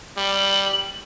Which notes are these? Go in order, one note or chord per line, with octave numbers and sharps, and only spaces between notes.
G3 F#7